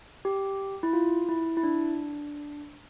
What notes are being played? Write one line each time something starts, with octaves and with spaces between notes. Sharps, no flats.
G4
E4
F4
E4
E4
D4